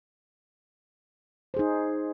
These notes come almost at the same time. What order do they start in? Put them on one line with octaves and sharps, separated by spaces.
C5 G#4 D#4